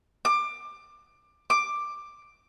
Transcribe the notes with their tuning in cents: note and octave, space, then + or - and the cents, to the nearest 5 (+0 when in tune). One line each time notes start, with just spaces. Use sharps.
D6 +20
D6 +10